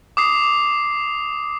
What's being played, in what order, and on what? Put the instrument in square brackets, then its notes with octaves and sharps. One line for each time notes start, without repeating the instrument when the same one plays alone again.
[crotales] D6 D#6 C7